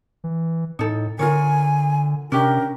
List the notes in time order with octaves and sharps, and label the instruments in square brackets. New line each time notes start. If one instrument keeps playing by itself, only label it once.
[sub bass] E3
[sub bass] A2 [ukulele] D#4 A4
[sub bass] D3 [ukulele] F4 A#4 C#5 [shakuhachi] G#5
[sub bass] C3 [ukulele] C#4 D4 G4 [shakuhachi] A#4